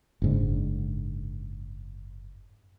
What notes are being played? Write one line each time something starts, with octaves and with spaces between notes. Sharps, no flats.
F#1 G#2 D3